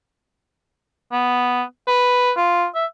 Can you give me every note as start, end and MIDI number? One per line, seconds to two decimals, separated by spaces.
1.12 1.62 59
1.88 2.31 71
2.37 2.65 65
2.75 2.86 76